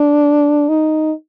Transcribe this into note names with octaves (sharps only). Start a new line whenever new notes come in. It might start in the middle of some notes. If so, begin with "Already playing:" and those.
Already playing: D4
D#4